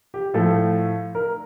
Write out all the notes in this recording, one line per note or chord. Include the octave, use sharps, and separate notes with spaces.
G4
A2 F3 A3 A4
A#4